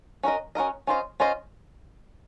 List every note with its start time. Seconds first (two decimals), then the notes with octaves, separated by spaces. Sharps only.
0.23 C#4 F#4 A#4 D#5
0.55 C#4 F#4 A#4 D#5
0.87 C#4 F4 C5 D#5
1.20 C#4 F4 C5 D#5